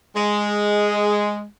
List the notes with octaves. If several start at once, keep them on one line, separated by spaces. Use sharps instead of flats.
G#3